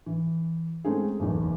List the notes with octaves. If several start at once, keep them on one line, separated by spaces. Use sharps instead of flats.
E3
G#3 A3 C4 C#4 D#4 G#4
F#1 B1 E2 E3